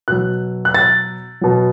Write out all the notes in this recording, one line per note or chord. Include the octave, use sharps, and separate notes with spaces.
B2 F#3 F#6
F#6
A6
B2 F#3